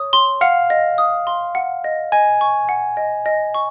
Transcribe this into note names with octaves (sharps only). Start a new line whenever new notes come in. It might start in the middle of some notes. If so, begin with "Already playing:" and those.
Already playing: C#5 D#6
C6
F5 F#5
D#5
D#6
C6
F#5
D#5
D#5 G#5
C#6
F#5
D#5
D#5
C#6